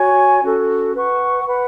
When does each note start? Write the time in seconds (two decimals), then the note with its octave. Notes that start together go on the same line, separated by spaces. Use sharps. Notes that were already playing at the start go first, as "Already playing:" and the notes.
Already playing: F#4 C#5 G#5 C#6
0.43 C#4 F#4 A4
0.94 B4 F#5 C#6
1.45 B4 F#5 B5